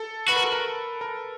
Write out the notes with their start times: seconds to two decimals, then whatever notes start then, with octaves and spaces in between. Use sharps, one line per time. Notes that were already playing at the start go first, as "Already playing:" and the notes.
Already playing: A4
0.28 F#4 B4
0.36 A#4
0.44 A4
0.52 A#4
1.01 A#4